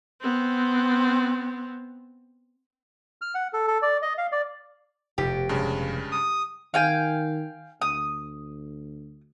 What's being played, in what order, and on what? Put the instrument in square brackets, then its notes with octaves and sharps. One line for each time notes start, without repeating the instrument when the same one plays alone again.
[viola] B3 C4
[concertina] F6
F#5
A4
A4
D5
D#5
F5
D5
[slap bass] F1 B2 [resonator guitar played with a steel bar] G4
[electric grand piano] G2 C#3 G#3
[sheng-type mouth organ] D#6
[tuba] D#3 [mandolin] F5 G5 G#5
[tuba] D2 [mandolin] D#6